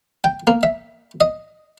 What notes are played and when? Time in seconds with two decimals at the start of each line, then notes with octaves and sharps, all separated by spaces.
0.24 G5
0.47 A#3
0.63 E5
1.21 D#5